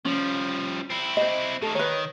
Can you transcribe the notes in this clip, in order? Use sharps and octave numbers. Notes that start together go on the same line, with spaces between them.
F3 G3 C#4
C4 E4
C5 D#5
A2 D#3 A4
D#3 B4 C#5